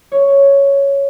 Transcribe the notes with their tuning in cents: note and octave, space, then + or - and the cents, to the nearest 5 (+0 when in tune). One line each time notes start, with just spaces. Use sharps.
C#5 +5